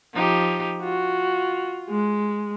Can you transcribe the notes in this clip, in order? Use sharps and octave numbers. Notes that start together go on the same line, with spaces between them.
F3 D#4 G4
F4 F#4
G#3